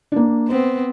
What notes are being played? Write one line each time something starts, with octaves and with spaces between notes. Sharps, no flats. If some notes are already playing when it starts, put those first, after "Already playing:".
A#3 D4
B3 C4 C5